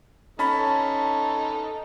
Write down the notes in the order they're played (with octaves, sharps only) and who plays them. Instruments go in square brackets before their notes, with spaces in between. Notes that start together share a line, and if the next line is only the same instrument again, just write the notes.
[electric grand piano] C#4 A5 B5 [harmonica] D#4 A4